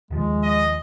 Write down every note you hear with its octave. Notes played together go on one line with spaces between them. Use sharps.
D#2 D#3 F3 G#3
D#5